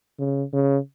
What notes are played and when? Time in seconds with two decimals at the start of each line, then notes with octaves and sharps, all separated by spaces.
0.19 C#3
0.53 C#3